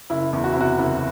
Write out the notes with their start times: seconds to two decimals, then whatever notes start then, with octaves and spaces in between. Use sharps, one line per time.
0.10 F#1 E4
0.33 E2
0.44 F#4
0.52 E4
0.56 C3 F#4
0.78 F#1 E4